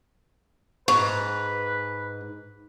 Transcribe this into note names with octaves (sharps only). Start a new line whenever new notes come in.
G#2 B4 C#6